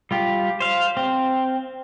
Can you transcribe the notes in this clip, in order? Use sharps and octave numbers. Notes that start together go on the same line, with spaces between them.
G3 F4 G4
C5 F5
C4